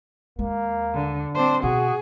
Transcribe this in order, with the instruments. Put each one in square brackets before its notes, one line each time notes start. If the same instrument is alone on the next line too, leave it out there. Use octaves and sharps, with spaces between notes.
[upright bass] D#2 G#3 [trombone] A#3
[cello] D3
[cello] C4 C5 [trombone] D4
[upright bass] B2 [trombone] F#4 [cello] G#4